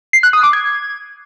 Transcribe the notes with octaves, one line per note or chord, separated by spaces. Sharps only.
C7
F#6
D#6
D6
G#6